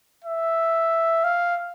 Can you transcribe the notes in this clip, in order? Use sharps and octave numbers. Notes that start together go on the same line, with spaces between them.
E5
F5